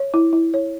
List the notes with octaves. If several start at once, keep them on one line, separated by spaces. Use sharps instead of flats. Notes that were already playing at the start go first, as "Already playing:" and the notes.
Already playing: C#5
E4
E4
C#5